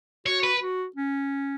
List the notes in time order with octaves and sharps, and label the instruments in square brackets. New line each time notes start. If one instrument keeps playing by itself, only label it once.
[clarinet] F#4 [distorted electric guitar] C#5
[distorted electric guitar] B4
[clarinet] F#4
C#4